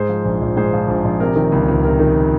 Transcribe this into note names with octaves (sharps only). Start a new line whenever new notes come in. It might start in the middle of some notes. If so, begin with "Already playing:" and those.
Already playing: G#2 G#4 C5
F3
A#1
A#1
G#2 G#4 C5
F3
A#1
A#1
C3 A#4
D#3
C#2
C#2
C3 A#4
D#3